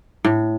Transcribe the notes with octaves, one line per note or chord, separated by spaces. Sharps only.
A2